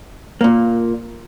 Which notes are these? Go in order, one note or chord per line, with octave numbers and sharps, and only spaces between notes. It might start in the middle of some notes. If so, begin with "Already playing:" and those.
A#2 A#3